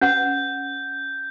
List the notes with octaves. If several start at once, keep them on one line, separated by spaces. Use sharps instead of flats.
C#4 B4 F#5 G6